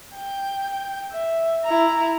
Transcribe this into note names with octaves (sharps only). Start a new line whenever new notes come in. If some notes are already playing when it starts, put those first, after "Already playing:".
G5
E5
E4 A#5